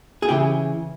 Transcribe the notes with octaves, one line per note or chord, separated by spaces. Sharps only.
G#4
C#3 E3 G4